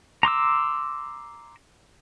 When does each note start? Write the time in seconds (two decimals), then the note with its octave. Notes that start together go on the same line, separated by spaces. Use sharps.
0.23 A#5 C6 D6 E6